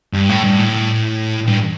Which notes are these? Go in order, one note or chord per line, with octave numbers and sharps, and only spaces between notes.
G2
A2
G2
A2
G2